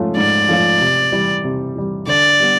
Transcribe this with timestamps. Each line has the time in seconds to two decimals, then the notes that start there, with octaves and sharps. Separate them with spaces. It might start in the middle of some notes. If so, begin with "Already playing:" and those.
Already playing: G#2 F3 A3 C#4 F4
0.17 G#2 D5
0.49 F3 A3 C#4 F4
0.80 C3
1.12 E3 G3
1.44 C3
1.76 E3 G3
2.07 D3 D5
2.40 G3 B3